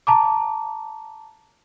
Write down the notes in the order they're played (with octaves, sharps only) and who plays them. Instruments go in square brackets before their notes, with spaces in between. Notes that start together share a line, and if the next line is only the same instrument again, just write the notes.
[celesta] A5 A#5 D6